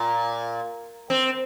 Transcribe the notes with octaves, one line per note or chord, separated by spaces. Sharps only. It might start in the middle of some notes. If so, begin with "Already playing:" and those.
Already playing: A#2
C4